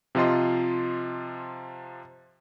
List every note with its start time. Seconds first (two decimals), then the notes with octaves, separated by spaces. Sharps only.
0.15 C3 F3 F4 D#5 C6